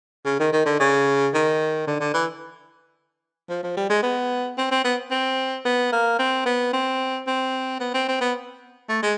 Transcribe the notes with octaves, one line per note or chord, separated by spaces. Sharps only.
C#3
D#3
D#3
D3
C#3
D#3
D3
D3
E3
F3
F3
G3
G#3
B3
C4
C4
B3
C4
B3
A#3
C4
B3
C4
C4
B3
C4
C4
B3
A3
G#3